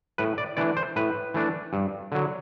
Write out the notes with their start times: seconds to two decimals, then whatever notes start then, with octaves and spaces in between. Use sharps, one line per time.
0.18 A2 B4
0.38 D5
0.57 E3 A3 D4 D5
0.77 C5
0.96 A2 B4
1.34 E3 A3 D4
1.73 G2
2.12 D3 F#3